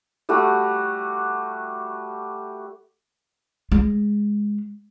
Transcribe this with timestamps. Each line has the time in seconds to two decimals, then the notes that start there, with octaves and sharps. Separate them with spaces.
0.29 G3 A3 F#4 G4
3.72 G#3